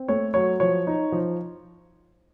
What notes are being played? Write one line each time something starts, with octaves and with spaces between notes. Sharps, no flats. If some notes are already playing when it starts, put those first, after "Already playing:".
Already playing: C4
A3 C#5
F#3 C#5
F3 C#5
D#4
F3